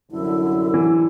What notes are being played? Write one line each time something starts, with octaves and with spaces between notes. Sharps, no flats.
C2 F#2 D3 E4
E3